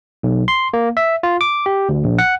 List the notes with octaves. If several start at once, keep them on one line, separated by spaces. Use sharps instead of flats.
B1
C6
A#3
E5
F4
D6
G4
D2
A#1
F#5